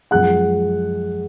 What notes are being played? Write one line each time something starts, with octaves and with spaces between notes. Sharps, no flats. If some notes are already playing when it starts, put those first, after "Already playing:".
F#2 F3 G#3 F#5 F#6